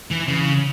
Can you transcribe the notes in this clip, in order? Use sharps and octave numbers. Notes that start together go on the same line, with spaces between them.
E3
C#3